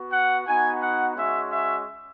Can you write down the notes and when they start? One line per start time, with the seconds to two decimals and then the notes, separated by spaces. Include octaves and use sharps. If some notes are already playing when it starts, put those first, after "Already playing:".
Already playing: B3 F#4
0.11 F#5
0.46 B3 D#4 F#4 G#5
0.81 F#5
1.16 G#3 C#4 F#4 E5
1.50 E5